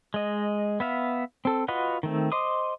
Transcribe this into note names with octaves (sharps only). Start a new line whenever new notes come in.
G#3 D#5
B3 E5 F5
C4 A4
F4 F#4 B4 D#5 F#5
D#3 A3 C4
C5 D#5 C6 D6 D#6